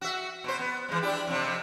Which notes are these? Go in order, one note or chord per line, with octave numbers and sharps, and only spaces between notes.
F#4 E5
B2 C5
B3
E3 G#3
D4 E4 G4
F2 C3